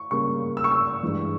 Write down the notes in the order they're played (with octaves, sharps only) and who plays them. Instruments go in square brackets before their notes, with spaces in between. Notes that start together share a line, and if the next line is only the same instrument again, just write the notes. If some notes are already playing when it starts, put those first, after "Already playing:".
Already playing: [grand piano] C#6
[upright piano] C#3 G3 A#3 C#4 [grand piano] C#6
[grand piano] E6
C#6
E6
[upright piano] G2 E3 G#3